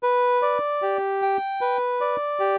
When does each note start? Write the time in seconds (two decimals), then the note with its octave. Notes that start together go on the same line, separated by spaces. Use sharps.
0.03 B4
0.42 D5
0.82 G4
1.22 G5
1.61 B4
2.01 D5
2.40 G4